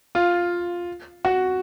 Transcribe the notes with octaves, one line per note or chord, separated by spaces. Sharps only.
F4
F#4